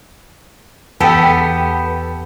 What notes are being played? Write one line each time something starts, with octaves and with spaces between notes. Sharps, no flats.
E2 B3 G4 A4 G5 A5